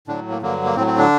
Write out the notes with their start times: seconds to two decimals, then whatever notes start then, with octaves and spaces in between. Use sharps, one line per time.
0.08 A2 D3 F#3 D4
0.30 A#3
0.42 G2 D3 F#3 A#3
0.65 A#3
0.75 A2 C4
0.79 F#3
0.87 C4
0.98 D3 D4